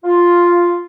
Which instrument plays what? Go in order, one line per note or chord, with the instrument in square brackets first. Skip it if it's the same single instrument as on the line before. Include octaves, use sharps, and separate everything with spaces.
[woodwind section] F4